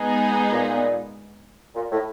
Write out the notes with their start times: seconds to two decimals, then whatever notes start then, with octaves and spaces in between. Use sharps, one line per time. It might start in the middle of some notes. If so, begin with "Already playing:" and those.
Already playing: G#3 B3 D#4 G#4
0.52 A#2
1.75 A#2
1.91 A2